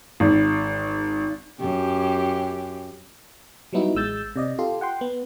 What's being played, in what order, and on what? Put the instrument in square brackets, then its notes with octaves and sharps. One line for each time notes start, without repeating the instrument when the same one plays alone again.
[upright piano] G#1
[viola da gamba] F#2 G4
[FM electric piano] F#3 G3 B3 D#4 E4 F#4
A1 G#3 E6 G6 A6
C3 D5 D#5
F4 G4 A4 C6
F#5 G5 C6
B3